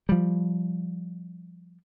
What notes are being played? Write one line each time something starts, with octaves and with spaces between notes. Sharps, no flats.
F3 G3